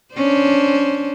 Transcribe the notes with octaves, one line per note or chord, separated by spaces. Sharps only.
C#4 D4 C5